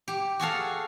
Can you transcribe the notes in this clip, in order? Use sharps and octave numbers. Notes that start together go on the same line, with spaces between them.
G4
F#4 G#4 A4 F5